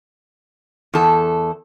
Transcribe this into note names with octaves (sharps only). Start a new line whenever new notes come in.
E2 A4